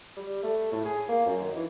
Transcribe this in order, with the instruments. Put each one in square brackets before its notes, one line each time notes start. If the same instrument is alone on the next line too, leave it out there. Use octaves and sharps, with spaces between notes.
[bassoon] G3
A3
A2
G#4
A#3
F#2
D#3
E3